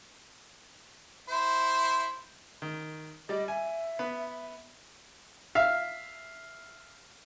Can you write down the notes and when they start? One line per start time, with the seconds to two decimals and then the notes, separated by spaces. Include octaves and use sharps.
1.29 E4 C5
2.62 D#3
3.29 G3 D5 D#5
3.48 E5 G#5
3.99 B3
5.55 E5 F5